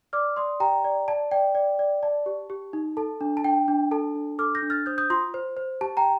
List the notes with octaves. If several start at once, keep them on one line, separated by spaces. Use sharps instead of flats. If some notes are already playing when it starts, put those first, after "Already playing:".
D5 D6 F6
D5 C6 D#6
G4 G5 A#5
D5
D5 A5
D5 G5
D5
D5
D5 A5
G4
G4
D#4
A4 A5
D4
A5
D4 G5
D4
A4 A5
D4
A4 D6 F6
G6 A#6
D4
F6 A6
C5 D#6 G6
D#6 G6
F4 C6 D#6
C5
C5
G4 A5
G5 A#5